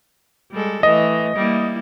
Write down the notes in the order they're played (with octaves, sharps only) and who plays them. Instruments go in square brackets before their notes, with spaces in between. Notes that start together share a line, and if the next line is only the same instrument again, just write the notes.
[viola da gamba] G3 G#3 A4
[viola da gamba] E3 A3 [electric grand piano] D#5
[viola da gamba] G3 A#3 E4